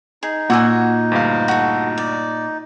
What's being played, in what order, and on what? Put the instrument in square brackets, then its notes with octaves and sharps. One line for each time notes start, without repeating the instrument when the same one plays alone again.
[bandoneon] D#4 [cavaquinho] G#4
[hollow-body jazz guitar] A#2 [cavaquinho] F#4 G#5 [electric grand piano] F#5 E6
[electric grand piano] D2 G2 F5
[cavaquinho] F#4 A4
D5